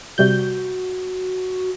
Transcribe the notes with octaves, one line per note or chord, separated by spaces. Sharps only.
C3 G3 F#4 G6